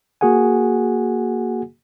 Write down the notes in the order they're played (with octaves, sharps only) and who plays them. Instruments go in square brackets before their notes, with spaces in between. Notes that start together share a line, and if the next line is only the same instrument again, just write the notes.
[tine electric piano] A#3 F#4 G#4 F#5 G#5